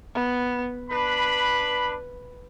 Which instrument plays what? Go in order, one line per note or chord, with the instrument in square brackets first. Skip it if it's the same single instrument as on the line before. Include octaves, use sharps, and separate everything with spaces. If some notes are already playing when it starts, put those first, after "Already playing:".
[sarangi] B3
[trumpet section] D4 B5 [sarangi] B4